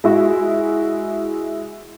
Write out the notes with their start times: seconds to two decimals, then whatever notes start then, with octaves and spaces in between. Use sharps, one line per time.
0.04 G#3 E4 F#4